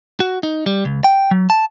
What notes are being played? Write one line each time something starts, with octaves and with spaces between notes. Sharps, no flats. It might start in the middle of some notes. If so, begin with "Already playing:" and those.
F#4
D#4
G3
C#2
G5
F#3
A5